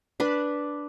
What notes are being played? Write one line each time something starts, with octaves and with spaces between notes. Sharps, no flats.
D4 B4